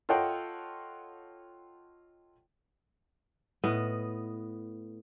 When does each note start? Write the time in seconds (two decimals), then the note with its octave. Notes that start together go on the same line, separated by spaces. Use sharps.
0.09 F4 A4 C#5 D#5 F#5 G5
3.64 A2 B3 D#5